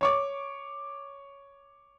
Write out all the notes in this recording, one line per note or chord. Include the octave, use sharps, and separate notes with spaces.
C#5 C#6 D6